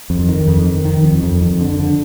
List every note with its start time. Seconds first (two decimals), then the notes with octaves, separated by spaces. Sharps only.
0.10 F2
0.29 D#3
0.48 F2
0.66 D#3
0.85 D#3
1.04 F2
1.23 F2
1.42 F2
1.60 D3
1.80 D3